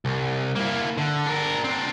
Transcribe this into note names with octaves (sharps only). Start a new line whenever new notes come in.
C2
A#3 E4
D3
D4 A#4
C4 D4